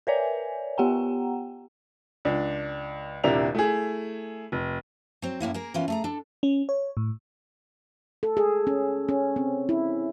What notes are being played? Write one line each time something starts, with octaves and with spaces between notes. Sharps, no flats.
A#4 B4 C#5 D5 E5 G#5
B3 G4 F#5 G5 A#5
C#2 D4
D#1 C3 D4 E4 A#4 F7
A3 E4 G#4
F1
F#3 C4
F#2 A2 A#3 E4
A#3 G#4 A#4
E3 A#3 B3 C#4 F4
A3 G#4 A#5
D4 A4
C#4
C#5
A2
A4
G#4
C#4
C#4
C4
E4